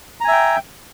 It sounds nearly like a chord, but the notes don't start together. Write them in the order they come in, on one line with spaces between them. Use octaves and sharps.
A#5 G#5 E5 G5